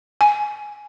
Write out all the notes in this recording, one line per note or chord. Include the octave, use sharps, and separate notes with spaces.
G#5